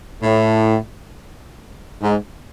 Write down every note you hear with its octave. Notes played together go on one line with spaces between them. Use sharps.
A2
G#2